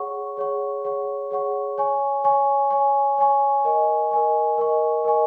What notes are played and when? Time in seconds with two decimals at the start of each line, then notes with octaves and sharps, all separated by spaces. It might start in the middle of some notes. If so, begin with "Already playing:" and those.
Already playing: G#4 C#5 F#5 C#6
0.37 G#4 C#5 F#5 C#6
0.84 G#4 C#5 F#5 C#6
1.31 G#4 C#5 F#5 C#6
1.78 C#5 G#5 C#6
2.24 C#5 G#5 C#6
2.71 C#5 G#5 C#6
3.18 C#5 G#5 C#6
3.64 A#4 D#5 G#5 C#6
4.11 A#4 D#5 G#5 C#6
4.58 A#4 D#5 G#5 C#6
5.05 A#4 D#5 G#5 C#6